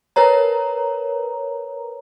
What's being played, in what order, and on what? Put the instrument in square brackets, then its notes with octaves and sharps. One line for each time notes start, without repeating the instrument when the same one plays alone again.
[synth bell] A#4 B4 C#5 A#5